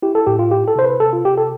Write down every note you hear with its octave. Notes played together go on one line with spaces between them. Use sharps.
E4 G4
A4
A2 G4
F4
E4 G4
A4
C3 C5
B4
C3 A4
F4
C3 G4
A4